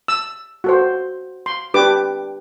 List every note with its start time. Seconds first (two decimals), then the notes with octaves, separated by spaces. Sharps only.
0.08 E6
0.64 F#4 A4 C5
1.46 C6
1.74 D4 G4 B4 D6